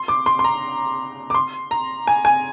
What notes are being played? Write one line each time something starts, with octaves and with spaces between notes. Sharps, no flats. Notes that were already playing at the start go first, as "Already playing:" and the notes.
Already playing: C6
D6
C6
C6
A#5
D6
C6
A#5
G#5
G#5